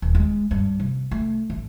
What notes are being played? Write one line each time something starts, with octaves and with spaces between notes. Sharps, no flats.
D#1
G#3
G2
C3
A3
A1